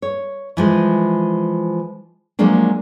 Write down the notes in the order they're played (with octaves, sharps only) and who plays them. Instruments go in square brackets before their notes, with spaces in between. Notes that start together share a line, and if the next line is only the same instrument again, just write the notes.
[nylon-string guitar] C#5
E3 F3 G#3
F3 F#3 G#3 A#3 D4